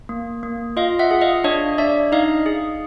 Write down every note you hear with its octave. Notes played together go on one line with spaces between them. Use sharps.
A#3
A#3
F4 D#5 F5
E5 F#5
G#4
D#5 F5
D4 C#5 D#5
D4 D5 E5
D#4 D#5 F5
G#4